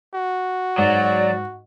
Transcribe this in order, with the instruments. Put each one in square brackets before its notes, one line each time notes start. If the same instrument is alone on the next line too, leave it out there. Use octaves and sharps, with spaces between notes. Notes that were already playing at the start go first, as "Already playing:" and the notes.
[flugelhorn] F#4
[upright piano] G#2 [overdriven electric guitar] F#3 [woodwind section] D5